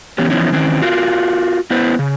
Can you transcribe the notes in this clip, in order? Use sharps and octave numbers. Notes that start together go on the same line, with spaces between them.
E3 B3 C#4 G4
E3 F3 B3 C#4 D#4 E4
D#3 E3 C4 C#4
F4 F#4 A#4 F5
B3 E4 B4 C5
C#3